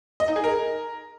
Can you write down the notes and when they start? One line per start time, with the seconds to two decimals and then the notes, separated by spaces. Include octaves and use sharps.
0.20 D#5
0.28 D#4
0.36 G#4
0.44 A#4